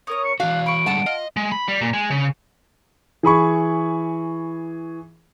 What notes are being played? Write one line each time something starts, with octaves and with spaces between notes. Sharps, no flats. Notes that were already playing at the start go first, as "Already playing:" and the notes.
C#4 A#4 C#5 D#6
C#7
E3 D4 F#4 F5 F#6
B5 C#6 D7
D3 G3 G#3 F#5 A5
F4 D#5
G#3
B5
G3
A#2
G#3
C#3
E3 G#4 B5 C#6